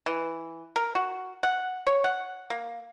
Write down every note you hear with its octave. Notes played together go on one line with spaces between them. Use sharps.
E3
A#4
F#4
F#5
C#5
F#5
A#3